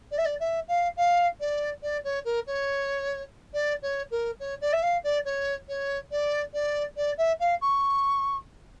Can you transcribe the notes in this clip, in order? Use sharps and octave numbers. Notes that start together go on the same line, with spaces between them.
D5
E5
D5
E5
F5
F5
D5
D5
C#5
A#4
C#5
D5
C#5
A#4
C#5
D5
E5
F5
D5
C#5
C#5
D5
D5
D5
E5
F5
C#6